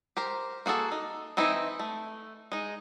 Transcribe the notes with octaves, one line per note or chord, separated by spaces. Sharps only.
G4 A#4 C5
A#3 F#4 G#4 A4
D#4
E3 C4 D#4 E4
A3
G#3 D#4